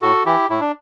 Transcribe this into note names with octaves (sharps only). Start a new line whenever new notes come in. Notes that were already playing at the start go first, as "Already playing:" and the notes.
A2 F#4 A4
E3 E4 G4
A2 E4
D4